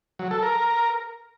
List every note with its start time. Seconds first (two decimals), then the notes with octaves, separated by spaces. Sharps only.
0.19 F#3
0.31 A4
0.42 A#4